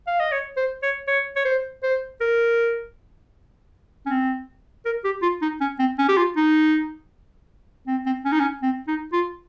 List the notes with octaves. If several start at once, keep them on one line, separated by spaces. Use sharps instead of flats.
F5
D#5
C#5
C5
C#5
C#5
C#5
C5
C5
A#4
C#4
C4
A#4
G4
F4
D#4
C#4
C4
C#4
G4
F4
D#4
C4
C4
C#4
D#4
C#4
C4
D#4
F4